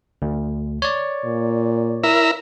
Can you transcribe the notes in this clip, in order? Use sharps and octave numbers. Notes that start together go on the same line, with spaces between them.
D2
C#5 D5
A#2
E4 A#4 E5